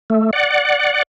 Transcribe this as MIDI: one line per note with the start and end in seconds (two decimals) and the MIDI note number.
0.10 0.31 57
0.33 1.03 74
0.33 1.03 78